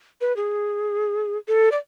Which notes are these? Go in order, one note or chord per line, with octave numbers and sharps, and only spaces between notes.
B4
G#4
A4
D5